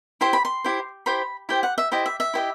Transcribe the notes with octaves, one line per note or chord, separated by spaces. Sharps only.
E4 G4 C5 C6
B5
C6
E4 G4 C5
E4 G4 C5 B5
E4 G4 C5 G5
F#5
E5
E4 G4 C5 D#5
E5
E5
E4 G4 C5 D#5